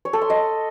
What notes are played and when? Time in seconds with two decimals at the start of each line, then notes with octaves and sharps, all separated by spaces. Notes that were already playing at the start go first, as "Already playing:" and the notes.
0.05 C#5
0.13 A4
0.21 C6
0.30 D#5